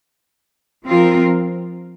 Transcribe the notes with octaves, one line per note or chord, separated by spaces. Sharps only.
F3 C4 F4 A#4